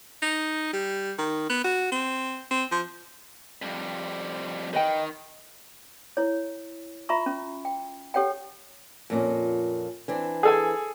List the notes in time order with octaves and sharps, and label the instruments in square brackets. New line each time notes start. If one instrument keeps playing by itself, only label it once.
[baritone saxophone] D#4
G3
D#3
B3
F#4
C4
C4
F3
[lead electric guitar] F2 G3
[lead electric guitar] D#3 [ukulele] B4 D#5 G5
[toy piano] E4 C#5
F4 E5 A#5 B5 C#6
C#4
G5
G4 A4 C#5 F#5 G5
[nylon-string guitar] F2 A#2 C#4
E3 C4 D4
[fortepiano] G#4 A4 G#5